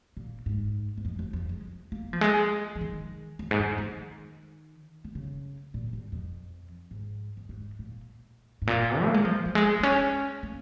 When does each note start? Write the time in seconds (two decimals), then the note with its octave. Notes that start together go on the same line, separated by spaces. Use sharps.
0.17 A#2
0.46 G#2
0.97 G#2
1.05 F2
1.19 F2
1.33 F2
1.49 G#3
1.92 A#3
2.13 F3
2.21 G#3
2.76 F3
2.81 D#3
3.39 F2
3.51 G#2
3.59 F2
3.78 D#3
5.05 D#3
5.15 C#3
5.74 A#2
5.93 G#2
6.12 F2
6.91 G#2
7.37 F2
7.49 G#2
7.79 A#2
8.62 G#2
8.67 A#2
9.04 A#3
9.14 G#3
9.25 F3
9.46 F3
9.55 G#3
9.80 A#3
9.83 C#4
10.43 A#3